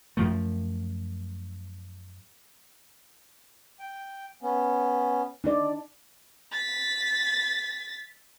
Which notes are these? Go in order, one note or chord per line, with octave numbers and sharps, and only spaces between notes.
F#2 F3 A3
G5
B3 C#4
D4 D#4 D5
A6 B6